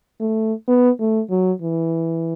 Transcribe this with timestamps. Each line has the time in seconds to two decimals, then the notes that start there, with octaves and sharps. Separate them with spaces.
0.20 A3
0.68 B3
1.00 A3
1.30 F#3
1.62 E3